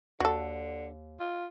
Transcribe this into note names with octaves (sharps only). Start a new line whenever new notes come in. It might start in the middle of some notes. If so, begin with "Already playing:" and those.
D#2 D3 F#4 A4
F4